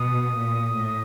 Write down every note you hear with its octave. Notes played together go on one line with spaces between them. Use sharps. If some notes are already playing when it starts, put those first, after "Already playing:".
Already playing: B2 D#6
A#2
A2